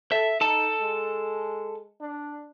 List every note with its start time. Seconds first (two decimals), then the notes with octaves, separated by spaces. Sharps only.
0.12 A4 E5
0.41 D#4 A4 A5
0.81 G#3
2.01 D4